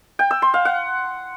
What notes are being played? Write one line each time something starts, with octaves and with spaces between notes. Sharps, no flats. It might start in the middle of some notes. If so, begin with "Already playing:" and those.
G5
E6
C6
F5
F#5